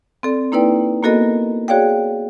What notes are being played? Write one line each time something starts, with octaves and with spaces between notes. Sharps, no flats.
C4 A4 D5
A#3 D#4 E4 B4 D5 G5
A#3 B3 F#4 A4 A#4 D#5
F#4 G#4 C#5 D5 F5 G5